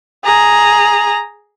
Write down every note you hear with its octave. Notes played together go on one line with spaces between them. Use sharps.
G#4 A#5